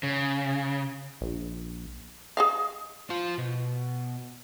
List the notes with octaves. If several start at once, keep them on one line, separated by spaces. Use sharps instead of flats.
C#3
A#1
G#4 D#5 F5
F4 C5
B2